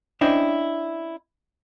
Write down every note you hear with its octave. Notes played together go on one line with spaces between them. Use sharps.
C#4 D4 E4 C5 D#5 G5